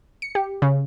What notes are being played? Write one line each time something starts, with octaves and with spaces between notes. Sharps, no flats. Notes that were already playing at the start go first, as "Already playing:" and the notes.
C#7
G4
C#3